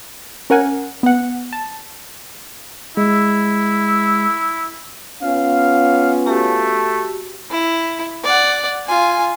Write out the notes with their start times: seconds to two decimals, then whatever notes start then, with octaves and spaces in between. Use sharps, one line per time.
0.50 C#4 A#4 F#5 G#5
1.03 B3 F#5
1.53 A5
2.97 G#3 E4
5.22 B3 C#4 F4 F5
6.27 A3 F#4 G4
7.51 E4
8.24 D5 F#5
8.87 F4 G#5